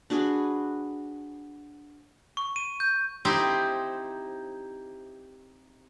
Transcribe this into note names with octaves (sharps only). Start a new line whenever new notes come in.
D4 F#4 G#4 B4
C#6
D#7
G6
C4 D#4 E4 G4 C5